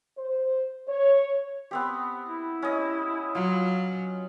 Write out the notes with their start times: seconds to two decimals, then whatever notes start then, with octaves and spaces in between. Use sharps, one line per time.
0.18 C5
0.89 C#5
1.71 B3 C4 G4
2.26 E4
2.62 C#4 D#5
3.35 F#3 F4